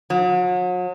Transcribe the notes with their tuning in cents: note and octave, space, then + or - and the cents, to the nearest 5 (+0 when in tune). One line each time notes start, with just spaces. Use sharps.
F#3 -40